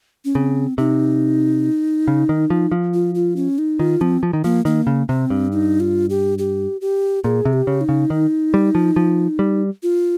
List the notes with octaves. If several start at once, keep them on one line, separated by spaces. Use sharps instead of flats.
C#4
C#3 C4
C3 D#4
C#3
D#3
F3
F3
F4
F4
C#4
D#4
D#3 F4
F3 C4
F3
D#3
F3 A#3
D#3 A#3
C#3
C3 C4
G2
D#4
F4
G4
G4
G4
A#2 G#4
C3
G4
C#3
D#4
C#3
D#3
G3
F3
F3
G3
F4